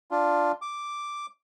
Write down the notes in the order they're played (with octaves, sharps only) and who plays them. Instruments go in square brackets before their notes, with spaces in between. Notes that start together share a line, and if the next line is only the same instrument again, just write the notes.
[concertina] D4 F4
D6